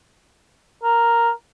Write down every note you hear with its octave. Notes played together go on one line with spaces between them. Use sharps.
A#4